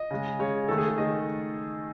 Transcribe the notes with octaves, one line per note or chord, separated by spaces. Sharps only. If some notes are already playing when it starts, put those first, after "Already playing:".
Already playing: D#5
C#3 G#3
C#3 G#3 C#5
D#3 A3 A4
G#4
G#4
D#3 A3 D#5